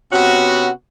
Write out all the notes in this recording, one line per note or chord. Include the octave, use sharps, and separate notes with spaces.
C3 B3 C#4 F#4